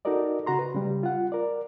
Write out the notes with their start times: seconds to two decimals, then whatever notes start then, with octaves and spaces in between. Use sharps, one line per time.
0.05 D#4 F#4 A4 A#4 D5 D#5
0.46 C#3 F#4 A#5 C6
0.59 B4
0.74 C#3 G3
1.03 F4 F#5
1.32 A#4 D5